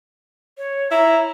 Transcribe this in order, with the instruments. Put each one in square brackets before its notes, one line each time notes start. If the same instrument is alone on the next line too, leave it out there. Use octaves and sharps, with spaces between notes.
[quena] C#5
[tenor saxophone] E4 [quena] A#5